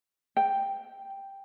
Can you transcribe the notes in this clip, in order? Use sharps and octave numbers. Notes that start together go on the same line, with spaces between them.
G5